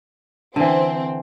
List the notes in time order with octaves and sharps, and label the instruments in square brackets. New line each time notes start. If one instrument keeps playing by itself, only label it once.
[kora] D3 E3 [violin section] C4